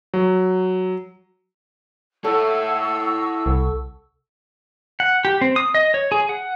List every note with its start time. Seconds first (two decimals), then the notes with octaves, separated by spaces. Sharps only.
0.14 F#3
2.24 E4 A4 C#5 F#5 C#6 E6
3.46 C2
5.00 F#5
5.25 G4
5.41 C4
5.56 D#6
5.75 D#5
5.94 C#5
6.12 G#4
6.29 F#5